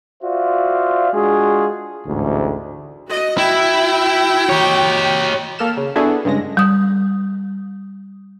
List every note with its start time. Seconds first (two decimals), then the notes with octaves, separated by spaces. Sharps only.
0.23 F4 F#4 C5 D5 E5 F5
1.12 G#3 D4 F4 F#4 G#4
2.06 A1 D2 G#2
3.08 F#4 D#5
3.38 E4 F#4 G5
4.49 G4 C#5
5.59 A#3 A4 F6 E7
5.77 C#3
5.96 B3 D4 E4 F#4 G#4 A4
6.25 G2 C#3 G#3 A#6
6.57 G3 D#6